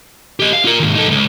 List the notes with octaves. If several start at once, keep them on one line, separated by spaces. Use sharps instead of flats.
G4 D#5
F5
F4 A#4
D#2 G#2
D#4 A4
C#2 F#2